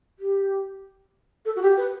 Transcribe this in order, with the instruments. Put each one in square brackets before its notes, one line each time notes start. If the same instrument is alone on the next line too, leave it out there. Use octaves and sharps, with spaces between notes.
[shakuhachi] G4
A4
F#4
G4
B4